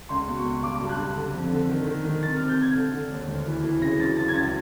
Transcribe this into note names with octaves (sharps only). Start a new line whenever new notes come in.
C#2 C6
B2
C#6
C#2
G2 D6
G2
F#6
G2
D3
F2
D3
D#3
D#3
D#3
C3 A6
F6
C3
G6
C3 G#6
D3
D3
D#2
D2
E3
E3
C#3 A#6
F#2 A6
F#2 A6
G#6
C#2 A6